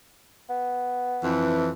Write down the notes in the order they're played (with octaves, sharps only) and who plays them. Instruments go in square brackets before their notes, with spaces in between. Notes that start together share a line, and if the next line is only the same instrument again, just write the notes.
[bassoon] B3
[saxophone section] F2 E3